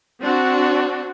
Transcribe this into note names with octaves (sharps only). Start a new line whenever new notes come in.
C4 D4 F#4